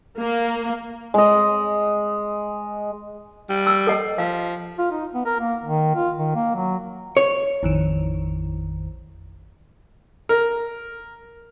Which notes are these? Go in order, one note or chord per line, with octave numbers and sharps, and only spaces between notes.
A#3
G#3 D#5
G3
E6
A4 D#5 F#5
F3 F5
F4
D#4
B3
A#4
A#3
D#3
F4
D#3
A#3
F#3
C#5
A1 F2 D#3
A#4